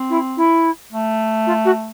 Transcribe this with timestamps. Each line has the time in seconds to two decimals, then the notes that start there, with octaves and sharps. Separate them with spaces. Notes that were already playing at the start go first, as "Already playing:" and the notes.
Already playing: C4
0.10 E4
0.37 E4
0.93 A3
1.47 F4
1.65 F#4